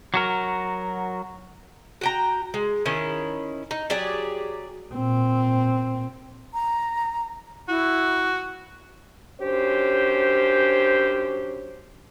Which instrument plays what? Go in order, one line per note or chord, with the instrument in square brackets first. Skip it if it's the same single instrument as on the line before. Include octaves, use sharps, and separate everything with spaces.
[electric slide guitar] F#3 F#4 A#4
[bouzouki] F#4 G5 A#5
G#3
D#3 C#4 E4
D#4
F#3 G4 G#4 D5
[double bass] A#2 C4
[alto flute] A#5
[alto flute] E4 [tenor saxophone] F#4
[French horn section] F#2 C#4 D4 G4 C5